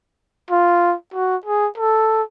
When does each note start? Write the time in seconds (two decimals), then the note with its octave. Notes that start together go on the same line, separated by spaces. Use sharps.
0.50 F4
1.14 F#4
1.45 G#4
1.77 A4